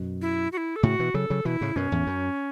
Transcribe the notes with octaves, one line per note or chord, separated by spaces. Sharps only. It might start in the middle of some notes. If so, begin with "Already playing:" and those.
Already playing: F#2 B2
E4
F#4
E4
A4
A2 C#3 F#4
B2 E3
C#3 F#3 A4
C#3 F#3
B2 E3 E4
A2 C#3
F#2 B2 C#4
E2 A2
F#2